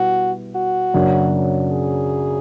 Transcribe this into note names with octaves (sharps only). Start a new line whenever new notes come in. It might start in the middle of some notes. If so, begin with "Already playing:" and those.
Already playing: B2 G3 B3 E4 F#4
F#4
F#2 C#3 F#3 A#3 D4
G#4